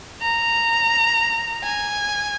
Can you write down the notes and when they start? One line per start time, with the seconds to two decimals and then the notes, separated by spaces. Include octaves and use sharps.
0.22 A#5
1.63 G#5